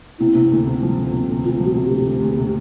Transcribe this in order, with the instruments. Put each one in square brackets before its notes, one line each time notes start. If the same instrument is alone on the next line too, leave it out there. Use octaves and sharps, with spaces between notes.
[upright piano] C3 [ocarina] E4
[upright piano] C3
D2
C3
F3
D2
C3
D2
[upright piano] D2 [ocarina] F4
[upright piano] F3
[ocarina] F#4
[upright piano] C3
[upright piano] D2 [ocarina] G4
[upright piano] D2
D2
C3